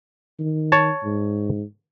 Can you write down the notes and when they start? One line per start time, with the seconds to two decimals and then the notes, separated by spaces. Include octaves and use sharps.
0.40 D#3
0.72 C#5 A5
1.04 G#2